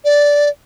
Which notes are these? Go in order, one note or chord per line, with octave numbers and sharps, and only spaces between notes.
D5